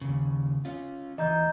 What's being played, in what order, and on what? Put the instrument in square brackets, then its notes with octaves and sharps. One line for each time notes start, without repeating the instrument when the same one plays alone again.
[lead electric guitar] D#2 C#3
C#4 F4
[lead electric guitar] D2 E3 [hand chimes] D#5 A#5 G6